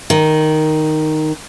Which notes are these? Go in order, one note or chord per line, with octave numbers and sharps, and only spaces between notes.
D#3